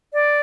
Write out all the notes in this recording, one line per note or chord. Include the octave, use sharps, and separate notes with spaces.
D5